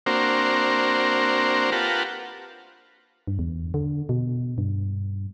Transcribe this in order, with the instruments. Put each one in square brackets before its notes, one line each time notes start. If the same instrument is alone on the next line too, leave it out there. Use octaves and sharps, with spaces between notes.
[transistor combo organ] A#3 C4 D4 F#4 A#4 C5
F4 G4 A#4 B4 F#5 A5
[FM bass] G2
E2
D3
B2
G2